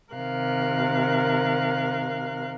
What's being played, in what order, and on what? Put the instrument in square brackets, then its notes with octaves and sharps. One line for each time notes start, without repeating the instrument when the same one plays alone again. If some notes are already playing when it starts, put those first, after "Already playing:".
[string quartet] C3 D#3 A#4 F5 F#6